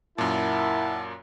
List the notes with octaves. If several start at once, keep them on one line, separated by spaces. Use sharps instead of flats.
F#2 A#2 E4 A#4 F#5 A5